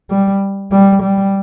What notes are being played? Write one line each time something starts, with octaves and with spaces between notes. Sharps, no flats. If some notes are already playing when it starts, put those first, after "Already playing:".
G3
G3
G3